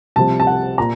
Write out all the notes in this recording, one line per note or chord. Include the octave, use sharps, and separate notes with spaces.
C2 C3 F3 A5
A5
F#5
A#2 A#5